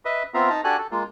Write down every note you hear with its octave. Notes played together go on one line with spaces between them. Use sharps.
B4 D#5 E5
B3 C4 F4 E5 F5 A#5
D#4 A5 A#5
D4 F#4 G4 A4 G#5 F#6
A4
G#3 A#3 F4